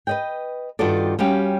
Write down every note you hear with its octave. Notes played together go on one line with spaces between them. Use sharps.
B4 D#5 G5
G2 D#3 F4 F#4 A4 D5
G3 C#4 F#4 G4 F5